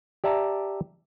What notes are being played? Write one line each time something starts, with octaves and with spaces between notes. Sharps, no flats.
G4 D5 E5 A5 A#5